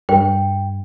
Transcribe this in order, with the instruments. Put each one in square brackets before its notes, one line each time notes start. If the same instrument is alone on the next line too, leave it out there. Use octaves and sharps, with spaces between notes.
[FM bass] G2 [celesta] G5